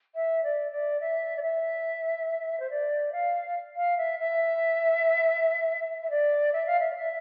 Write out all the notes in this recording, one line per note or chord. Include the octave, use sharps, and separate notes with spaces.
E5
D5
D5
E5
D5
E5
C5
D5
F5
F5
E5
E5
E5
D5
E5
F5
E5
D5
E5